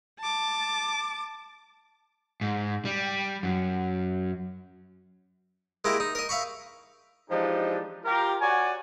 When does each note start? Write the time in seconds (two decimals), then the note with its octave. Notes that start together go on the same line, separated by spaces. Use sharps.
0.19 A5 D6
2.41 G#2
2.85 G3
3.43 F#2
5.85 G#3 A#3 E4 G4
6.00 D#4
6.15 A#4 D#5
6.29 E5 F5 B5 C#6
7.30 E3 F3 G#3 D4 D#4 G4
8.05 F4 G4 A#4
8.41 F#4 C#5 D5 F#5 G#5